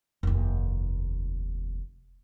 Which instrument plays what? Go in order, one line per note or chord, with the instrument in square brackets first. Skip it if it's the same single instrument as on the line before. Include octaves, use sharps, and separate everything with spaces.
[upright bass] F1 D#2